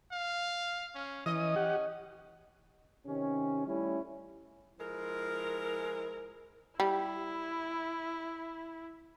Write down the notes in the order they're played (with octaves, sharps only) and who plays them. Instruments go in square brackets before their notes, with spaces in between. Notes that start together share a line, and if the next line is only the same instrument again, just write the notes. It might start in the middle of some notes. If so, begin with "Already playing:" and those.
[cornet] F5
C#4
[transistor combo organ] E3 D#6 [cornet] C#4 [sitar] D#5
[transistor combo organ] G4 F#5
[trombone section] C3 D#3 C#4
G3 A3 C#4 E4
[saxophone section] F3 G#3 E4 A#4
[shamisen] G3 [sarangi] E4